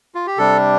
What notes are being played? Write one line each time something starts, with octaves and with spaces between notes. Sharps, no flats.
F4
G4
C3 G3 D4 A4